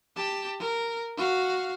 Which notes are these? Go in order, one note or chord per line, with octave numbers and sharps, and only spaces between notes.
G4 A5
A#4
F#4 F5